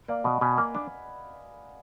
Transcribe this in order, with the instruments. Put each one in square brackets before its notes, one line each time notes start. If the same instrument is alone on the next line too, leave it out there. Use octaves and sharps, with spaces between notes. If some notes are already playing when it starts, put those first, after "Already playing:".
[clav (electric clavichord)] A#3 [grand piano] D5 F5
[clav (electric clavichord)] B2 [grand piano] D#5 F#5
[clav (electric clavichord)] B2 [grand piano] G#5 B5
[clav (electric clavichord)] A#3
D4